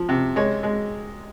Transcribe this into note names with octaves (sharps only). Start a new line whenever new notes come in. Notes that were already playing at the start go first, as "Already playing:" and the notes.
Already playing: F3
C3
G#3 C#5
G#3